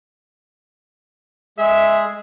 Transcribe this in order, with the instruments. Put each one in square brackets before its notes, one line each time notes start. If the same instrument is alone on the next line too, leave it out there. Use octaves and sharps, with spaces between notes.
[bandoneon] G#3 G#4 [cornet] E5